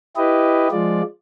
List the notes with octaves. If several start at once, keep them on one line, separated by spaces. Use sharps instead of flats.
E4 G4 B4 D#5
F3 G#3 F4 D5